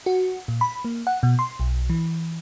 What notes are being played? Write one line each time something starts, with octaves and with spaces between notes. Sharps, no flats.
F#4
A#2
B5
A#3
F#5
B2
C6
B1
E3